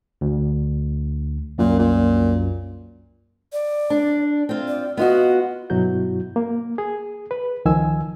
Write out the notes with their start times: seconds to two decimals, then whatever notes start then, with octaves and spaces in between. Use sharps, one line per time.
0.21 D2
1.58 C2 F#2 A#2
1.79 A#2
3.53 D5
3.90 D4
4.49 C4 F4
4.68 D5
4.97 B3 F4 F#4 D#5
5.70 G2 B2 F#3 E4 F#4 G6
6.36 A#3
6.78 G#4
7.31 B4
7.65 C#2 D#3 F3 G#5 E6